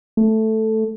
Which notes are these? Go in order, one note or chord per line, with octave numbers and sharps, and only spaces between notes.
A3